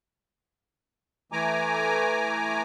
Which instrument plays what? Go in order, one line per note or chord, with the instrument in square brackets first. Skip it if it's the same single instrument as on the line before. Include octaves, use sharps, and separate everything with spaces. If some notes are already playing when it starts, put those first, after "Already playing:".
[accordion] E3 A3 G#5 A#5 D6